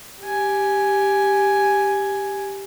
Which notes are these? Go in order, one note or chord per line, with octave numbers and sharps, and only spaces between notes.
G4 G#5